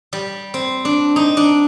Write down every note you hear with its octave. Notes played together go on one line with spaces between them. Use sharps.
G3
C4
D4
D#4
D4